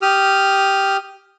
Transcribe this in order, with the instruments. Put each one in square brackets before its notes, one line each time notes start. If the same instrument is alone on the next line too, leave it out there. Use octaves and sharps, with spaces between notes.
[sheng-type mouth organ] G4 D#6 F6